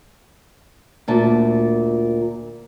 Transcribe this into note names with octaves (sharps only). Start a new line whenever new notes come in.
D2 A#2 A5